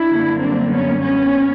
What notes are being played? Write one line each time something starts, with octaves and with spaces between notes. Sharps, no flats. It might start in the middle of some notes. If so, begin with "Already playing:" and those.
Already playing: D4 E4
F#2 D3 G3 A#3
C4 D4
B3 C#4
B3 C#4